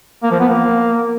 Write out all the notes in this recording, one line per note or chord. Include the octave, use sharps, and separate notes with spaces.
A#3
F3
B3
A#3